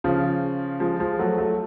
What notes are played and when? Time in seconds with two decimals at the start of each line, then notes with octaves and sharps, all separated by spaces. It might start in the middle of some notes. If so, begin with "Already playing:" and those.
0.04 C#3 F3
0.80 F3 G#3
0.99 F3 G#3
1.19 F#3 A3
1.38 F#3 A3